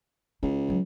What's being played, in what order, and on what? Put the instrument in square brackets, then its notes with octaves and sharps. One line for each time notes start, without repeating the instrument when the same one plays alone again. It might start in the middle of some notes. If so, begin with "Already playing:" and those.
[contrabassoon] C#2 [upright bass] D#4 E4
[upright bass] D3 F#3